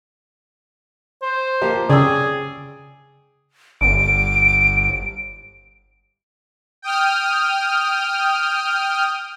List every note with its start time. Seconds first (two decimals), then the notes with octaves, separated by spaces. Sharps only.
1.22 C5
1.61 F3 A#3 G4
1.90 C#3 G#4 D5 G5 E6
3.81 G1 D7
6.82 G5 D#6 F6